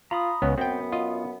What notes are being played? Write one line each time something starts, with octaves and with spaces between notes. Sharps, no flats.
F4 A#5 B5 D#6
C#2 B3 C#4
F#2 B3 C4 G5
F4 D#5